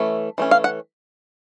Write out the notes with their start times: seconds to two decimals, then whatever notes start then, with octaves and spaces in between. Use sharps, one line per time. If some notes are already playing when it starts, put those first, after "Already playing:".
Already playing: E3 A3 C#4
0.38 E3 A3 C#4
0.51 F5
0.64 F#5